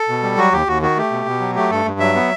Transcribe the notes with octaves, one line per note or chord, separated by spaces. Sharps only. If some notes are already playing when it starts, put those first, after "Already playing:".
Already playing: A4
B2
G3
F#3 F#4
D#2 G4
D#2 F#4
D#3 F#4
A3 G4
B2
B2
F#3
A3 G4
G2 A4
G2
F#3 E5
B3